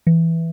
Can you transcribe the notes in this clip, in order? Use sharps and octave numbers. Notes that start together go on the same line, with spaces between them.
E3